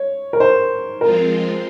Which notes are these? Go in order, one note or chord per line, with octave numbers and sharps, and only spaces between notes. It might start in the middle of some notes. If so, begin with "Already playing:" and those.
Already playing: C#5
A#4
C5
F3 G#3 C4 F4 A#4